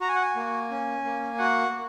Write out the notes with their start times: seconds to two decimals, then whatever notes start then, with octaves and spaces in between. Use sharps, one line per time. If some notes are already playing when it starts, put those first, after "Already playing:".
0.01 F#4 A#5
0.08 G#5
0.16 F#5
0.21 G#5
0.36 A#3
0.70 C#4
1.05 A#3
1.38 F#4 F#5
1.73 A#3